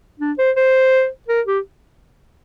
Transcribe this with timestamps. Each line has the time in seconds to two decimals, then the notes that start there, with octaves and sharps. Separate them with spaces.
0.20 D4
0.39 C5
0.56 C5
1.29 A#4
1.47 G4